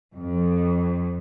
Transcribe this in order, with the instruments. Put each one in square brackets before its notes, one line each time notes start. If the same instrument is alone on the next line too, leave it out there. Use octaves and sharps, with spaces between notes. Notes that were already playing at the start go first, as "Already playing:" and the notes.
[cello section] F2